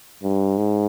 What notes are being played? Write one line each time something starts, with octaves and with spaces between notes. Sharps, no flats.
G2
G#2